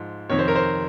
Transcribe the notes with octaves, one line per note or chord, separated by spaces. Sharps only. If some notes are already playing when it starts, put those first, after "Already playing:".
Already playing: G#2 F3
F2 C3 D#3 C#5
C5
A#4
C5